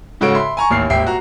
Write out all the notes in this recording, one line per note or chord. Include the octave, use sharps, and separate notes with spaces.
G#2 C#3 F#4 A4 C#5 D7
E5 B5 C6
G#5 A#5 C#6
A1 D#2 C#5 F6 C7
D#1 G#1 E5 G5 C7
F#4 A#5